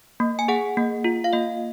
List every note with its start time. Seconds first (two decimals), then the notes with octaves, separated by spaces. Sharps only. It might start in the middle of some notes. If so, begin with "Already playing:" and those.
0.20 A#3
0.39 G#5
0.48 G#4 F#5
0.77 A#3
1.04 F4
1.24 F5
1.33 A#3 D#5